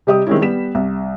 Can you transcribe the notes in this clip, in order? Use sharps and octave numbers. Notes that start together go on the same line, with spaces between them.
C3 G3 G4 D#5 D#6
D#3 G3 G#3 C4 C#4 E4
G3 B3 B6 E7
C2